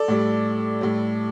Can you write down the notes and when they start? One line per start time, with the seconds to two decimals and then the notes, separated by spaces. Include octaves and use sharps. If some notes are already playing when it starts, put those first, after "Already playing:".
Already playing: A4 D5
0.08 A2 G3
0.81 A2 G3